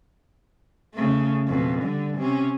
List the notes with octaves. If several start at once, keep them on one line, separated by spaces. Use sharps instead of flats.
C#3 A3
F2 B2
D3 G3
C3 C#4